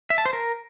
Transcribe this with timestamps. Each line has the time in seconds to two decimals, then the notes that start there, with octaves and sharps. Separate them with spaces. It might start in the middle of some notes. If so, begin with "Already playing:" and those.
0.10 E5
0.18 A5
0.25 C5
0.33 A#4